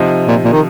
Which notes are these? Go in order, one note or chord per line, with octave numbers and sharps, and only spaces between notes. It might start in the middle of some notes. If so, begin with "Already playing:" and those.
Already playing: C3 F3 D#4
A#2
A#2
D#3